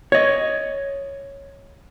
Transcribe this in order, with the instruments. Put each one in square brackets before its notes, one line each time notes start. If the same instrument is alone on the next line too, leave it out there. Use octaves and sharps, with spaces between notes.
[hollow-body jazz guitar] C#5 D#5